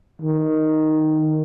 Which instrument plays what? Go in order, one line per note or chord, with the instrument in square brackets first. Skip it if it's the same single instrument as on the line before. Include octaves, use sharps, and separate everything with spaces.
[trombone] D#3